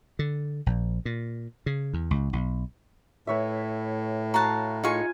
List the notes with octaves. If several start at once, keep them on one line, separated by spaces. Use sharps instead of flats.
D3
A#1
A#2
C#3
E2
C#2
B1
A2 B4 C#5 E5
F#4 F5 A5 A#5 F#6
D#4 F4 G#4 G#5 C#6